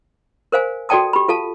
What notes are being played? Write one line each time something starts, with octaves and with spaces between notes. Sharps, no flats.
A#4 C5 F5 G#5
F#4 A4 D5 G5 A5 D#6
G4 B5
F4 A4 F5 A5